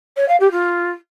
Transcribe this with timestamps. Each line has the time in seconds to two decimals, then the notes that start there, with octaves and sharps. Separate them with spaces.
0.17 C#5
0.29 F5
0.40 G4
0.52 F4